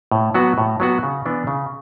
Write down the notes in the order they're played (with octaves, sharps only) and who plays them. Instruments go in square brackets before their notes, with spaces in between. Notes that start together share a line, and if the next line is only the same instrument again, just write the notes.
[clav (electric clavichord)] A2
F#3 B3 F#4
A2
F#3 B3 F#4
C#3
E3 B3 D4
C#3